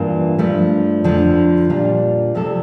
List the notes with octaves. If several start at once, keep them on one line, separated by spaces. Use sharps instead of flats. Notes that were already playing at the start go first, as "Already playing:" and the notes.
Already playing: G2 E3 A#3 F4
G2 F3 A3
F2 D3 F3
A#2 G3 D4 F4
C3 F3 A3 D4 A4